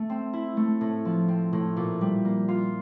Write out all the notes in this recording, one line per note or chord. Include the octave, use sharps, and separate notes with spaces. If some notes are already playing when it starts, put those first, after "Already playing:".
Already playing: A3
C4
E4
A3
A2
F3
C4
A2
A#2
G3
A#3
F4